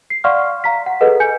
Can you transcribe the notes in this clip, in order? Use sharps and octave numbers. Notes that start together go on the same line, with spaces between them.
C7
D5 F5 F#5 C6 C#6 F6
F5 A#5 B6
F#5
G#4 A4 B4 D#5 F#5
G#5 G6 C#7